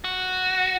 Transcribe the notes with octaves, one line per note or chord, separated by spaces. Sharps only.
F#4